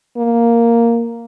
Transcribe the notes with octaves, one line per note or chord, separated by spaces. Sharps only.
A#3